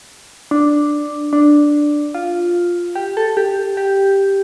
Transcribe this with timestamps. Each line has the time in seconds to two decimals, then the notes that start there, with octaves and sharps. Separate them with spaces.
0.51 D4
1.33 D4
2.14 F4
2.95 G4
3.17 A4
3.37 G4
3.77 G4